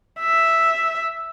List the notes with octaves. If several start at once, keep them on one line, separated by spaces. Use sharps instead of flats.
E5